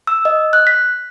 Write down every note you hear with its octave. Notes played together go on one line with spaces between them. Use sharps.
E6
D#5
F#6
B6